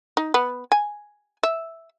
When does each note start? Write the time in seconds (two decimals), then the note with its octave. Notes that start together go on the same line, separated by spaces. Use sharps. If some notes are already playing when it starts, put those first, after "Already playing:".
0.17 D#4
0.34 B3
0.72 G#5
1.43 E5